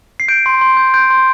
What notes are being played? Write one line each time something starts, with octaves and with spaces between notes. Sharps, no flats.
C7
G6 D7
C6
C6
G6
G6 D7
C6